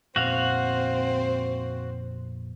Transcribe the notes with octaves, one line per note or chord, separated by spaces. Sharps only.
F2 A#2 B3 C4 F#4 F5 F#5